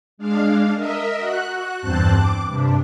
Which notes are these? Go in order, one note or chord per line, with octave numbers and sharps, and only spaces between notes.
G#3 D4 F5
A#4 D#5 E5
F#4 F#6
E2 G2 C4 C5 A5 F#6
D6
G2 C3 D4